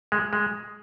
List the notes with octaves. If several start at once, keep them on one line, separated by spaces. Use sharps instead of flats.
G#3
G#3